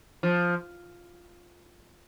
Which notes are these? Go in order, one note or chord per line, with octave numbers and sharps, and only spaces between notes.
F3